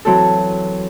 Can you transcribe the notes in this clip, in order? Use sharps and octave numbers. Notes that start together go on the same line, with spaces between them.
E3 F#3 C4 F#4 A4